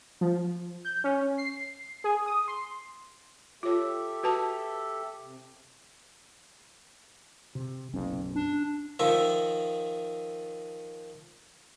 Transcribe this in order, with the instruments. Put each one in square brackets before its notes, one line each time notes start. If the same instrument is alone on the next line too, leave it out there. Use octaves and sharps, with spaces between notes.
[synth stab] F3
G6
C#4
C7
G#4
D#6
C6
[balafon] F4 C#5 [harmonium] G4 A4 E5
[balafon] F#4 B4 A5
[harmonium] C3
[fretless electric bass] C3
[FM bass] F#1 [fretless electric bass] B1 F#2 C#4
[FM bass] D4
[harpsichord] D#3 F3 E5